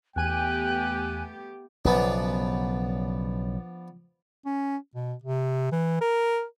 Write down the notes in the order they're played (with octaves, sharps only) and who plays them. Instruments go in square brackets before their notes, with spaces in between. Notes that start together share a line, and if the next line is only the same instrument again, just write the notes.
[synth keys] E2 G#5 D#7 [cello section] A3 B3 G4 [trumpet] G5 [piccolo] F#6
[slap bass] B1 C#3 [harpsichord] F3 B3 D4
[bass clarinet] C#4
B2
C3
E3
A#4